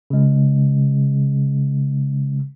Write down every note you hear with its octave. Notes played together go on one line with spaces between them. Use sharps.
C#3 G#3